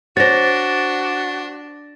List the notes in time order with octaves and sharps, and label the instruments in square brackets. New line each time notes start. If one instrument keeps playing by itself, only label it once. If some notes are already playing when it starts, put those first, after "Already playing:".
[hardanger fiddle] D4 [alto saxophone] F#4 [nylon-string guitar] C5 C#5 [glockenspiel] A6 A#6